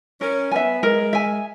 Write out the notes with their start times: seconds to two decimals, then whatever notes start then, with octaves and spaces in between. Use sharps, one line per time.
0.20 C#4 A#4
0.51 B3 E5 G#5
0.82 G#3 A#4
1.13 E5 G#5